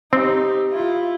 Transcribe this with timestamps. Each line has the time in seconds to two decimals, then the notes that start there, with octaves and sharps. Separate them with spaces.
0.13 C4 D#4 G4
0.71 E4 F4